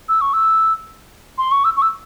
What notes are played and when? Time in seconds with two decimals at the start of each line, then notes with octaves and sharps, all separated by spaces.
0.09 E6
0.21 C#6
0.33 E6
1.38 C6
1.51 C#6
1.65 E6
1.77 C#6
1.82 E6